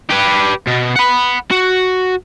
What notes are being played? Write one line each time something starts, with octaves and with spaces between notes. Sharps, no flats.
G4 B4
B2
F#5 B5
F#4